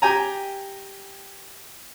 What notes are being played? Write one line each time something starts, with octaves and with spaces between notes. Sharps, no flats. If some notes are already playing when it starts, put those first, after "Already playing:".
G4 G5 G#5 A#5